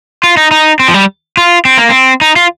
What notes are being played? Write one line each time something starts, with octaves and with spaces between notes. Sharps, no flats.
F4
D#4
D#4
C4
F3
G3
F4
C4
A#3
C4
D#4
F4